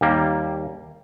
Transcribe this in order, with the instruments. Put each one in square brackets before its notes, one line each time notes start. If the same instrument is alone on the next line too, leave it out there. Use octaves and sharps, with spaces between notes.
[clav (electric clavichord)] D#2 G3 A#3